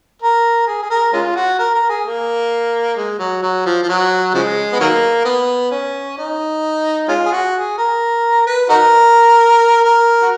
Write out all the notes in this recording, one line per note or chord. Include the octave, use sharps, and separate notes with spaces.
A#4
G#4
G#4
A#4
G#3 C#4 F4
F#4
A#4
A#4
G#4
A#3
G#3
F#3
F#3
F3
F3
F#3
C#3 F3 G#3
B3
D#3 F#3 A#3
B3
C#4
D#4
G#3 C#4 F4
G#4
F#4
G#4
A#4
B4
D#4 F#4 A#4
A#4
F#4